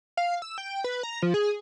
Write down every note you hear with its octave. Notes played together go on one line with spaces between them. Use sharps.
F5
E6
G5
B4
A#5
F3
G#4